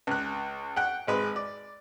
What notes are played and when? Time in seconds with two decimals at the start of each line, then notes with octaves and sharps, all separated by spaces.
0.07 C#2 F#6
0.76 F#5 G5 F#6
1.07 G#1 G#3 B4
1.36 D5